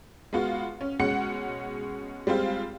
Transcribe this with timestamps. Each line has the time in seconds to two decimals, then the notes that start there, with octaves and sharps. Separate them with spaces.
0.33 G#3 B3 F4 F#4
0.81 C#4
0.99 B2 G#3 C#4 F#5 C#7
2.27 G3 G#3 C4 F4